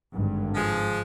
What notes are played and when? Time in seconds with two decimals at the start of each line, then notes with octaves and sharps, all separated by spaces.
0.14 G#1 G2 D3
0.55 F3 G#3